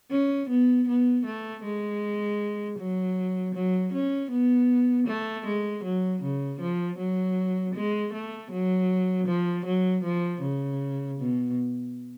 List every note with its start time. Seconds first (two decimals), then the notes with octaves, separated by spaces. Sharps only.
0.11 C#4
0.49 B3
0.88 B3
1.26 A3
1.64 G#3
2.78 F#3
3.55 F#3
3.93 C#4
4.31 B3
5.07 A3
5.45 G#3
5.84 F#3
6.22 C#3
6.60 F3
6.98 F#3
7.75 G#3
8.13 A3
8.51 F#3
9.27 F3
9.65 F#3
10.04 F3
10.42 C#3
11.19 B2